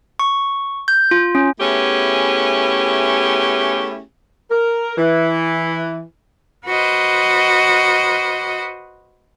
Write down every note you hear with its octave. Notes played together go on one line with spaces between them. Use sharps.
C#6
G6
F4
C#4
A3 B3 C#4 E4 G4 G#4
A#4
E3
F#4 B4 C5 D#5